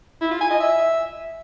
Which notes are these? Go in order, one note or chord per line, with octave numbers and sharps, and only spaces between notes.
E4
F4
G#5
D#5
E5